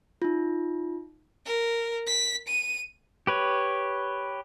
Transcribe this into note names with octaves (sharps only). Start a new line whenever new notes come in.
D#4 F4
A#4
B6
D#7
G4 B4 C#5